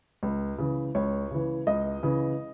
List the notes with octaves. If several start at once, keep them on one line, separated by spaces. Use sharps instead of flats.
C#2
C#3 E3
C#2 C#5
C#3 E3
C#2 D#5
C#3 E3